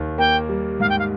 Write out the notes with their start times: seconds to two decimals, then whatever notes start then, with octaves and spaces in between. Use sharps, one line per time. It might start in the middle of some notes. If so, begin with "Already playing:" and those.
Already playing: D#2 D#3
0.18 A#3 G5
0.49 G3
0.80 G#2 F5
0.89 G5
0.98 F5